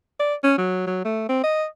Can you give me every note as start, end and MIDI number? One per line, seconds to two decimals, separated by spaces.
0.20 0.35 74
0.44 0.56 61
0.58 0.84 54
0.87 1.03 54
1.05 1.29 57
1.29 1.41 60
1.44 1.65 75